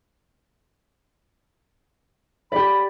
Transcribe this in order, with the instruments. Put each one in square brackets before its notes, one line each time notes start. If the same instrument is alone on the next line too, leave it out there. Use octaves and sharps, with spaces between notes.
[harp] G4 D5 [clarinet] B5